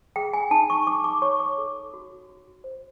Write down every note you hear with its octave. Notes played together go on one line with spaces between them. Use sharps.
G#4 G5
G#5
D#4 A5
C#6
D#4 D6
D6
C#5 C#6
D6
A4
F#4
F#4
C5